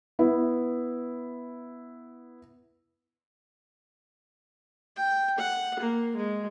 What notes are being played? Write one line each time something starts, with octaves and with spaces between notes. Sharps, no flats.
B3 E4
G5
F#5
A#3
G#3